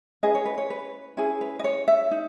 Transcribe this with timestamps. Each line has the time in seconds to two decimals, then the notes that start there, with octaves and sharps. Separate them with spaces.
0.23 C#4 E4 G#4 B4 D#5
0.35 C#5
0.46 B4
0.58 C#5
0.70 B4
1.17 C#4 E4 G#4 B4
1.41 B4
1.59 D#5
1.64 C#5
1.88 E5
2.11 D#4